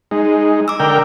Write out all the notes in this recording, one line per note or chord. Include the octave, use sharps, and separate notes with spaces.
G#3 D#4
D6 E6
D3 A#4 G5